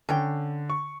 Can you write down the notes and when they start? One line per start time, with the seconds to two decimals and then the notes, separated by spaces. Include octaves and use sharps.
0.09 D3 C#4 C#5 G5
0.70 C#6